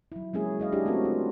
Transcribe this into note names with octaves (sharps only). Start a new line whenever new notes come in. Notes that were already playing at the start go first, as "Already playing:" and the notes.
F#3 E4
F#3 G#3 A#3 C#4 E4 G#4
E4 D#5 F5
D4 E4 G4 G#4
A3 C4 C#4 F#4 A#4
F4